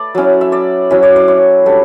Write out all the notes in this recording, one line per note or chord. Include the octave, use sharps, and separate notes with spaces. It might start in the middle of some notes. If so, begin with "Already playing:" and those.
Already playing: A3 B4 D5
F#3 C#4 E4
E5
D5
F#3 C#4 E4 E5
D5
D5
C#5
G3 D4 A4